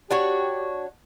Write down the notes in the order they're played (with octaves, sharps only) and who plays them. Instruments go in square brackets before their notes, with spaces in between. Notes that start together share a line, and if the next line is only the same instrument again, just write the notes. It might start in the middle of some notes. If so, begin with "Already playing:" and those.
[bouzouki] D4 F#4 C#5 [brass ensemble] G4